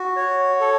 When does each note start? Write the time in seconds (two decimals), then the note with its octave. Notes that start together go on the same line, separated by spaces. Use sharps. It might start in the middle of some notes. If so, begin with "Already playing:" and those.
Already playing: F#4
0.16 C#5
0.60 A4